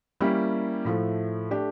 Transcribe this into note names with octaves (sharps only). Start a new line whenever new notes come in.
G3 A#3 C#4 E4 G4
A2 F3 A3
A3 D4 G4